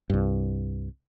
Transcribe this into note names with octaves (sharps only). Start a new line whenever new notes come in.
C2 G2